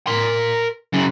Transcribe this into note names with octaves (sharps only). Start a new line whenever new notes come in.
A#4 C6
F#2 C#3